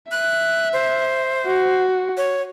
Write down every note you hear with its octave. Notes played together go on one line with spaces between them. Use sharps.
E5 F#6
C5
F#4
C#5